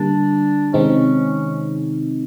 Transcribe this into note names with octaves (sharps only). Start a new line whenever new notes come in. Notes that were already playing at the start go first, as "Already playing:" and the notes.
Already playing: D3 G3 A#3 D4
C3 D#3 G#3 C4 C#4 D#4